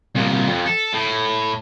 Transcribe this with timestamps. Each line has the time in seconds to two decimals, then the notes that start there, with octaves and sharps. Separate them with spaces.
0.15 C2 A#2
0.49 F2
0.66 A4
0.94 A2